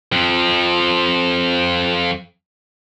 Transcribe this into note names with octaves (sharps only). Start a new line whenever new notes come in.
F2 F3